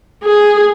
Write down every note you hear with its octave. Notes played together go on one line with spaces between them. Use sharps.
G#4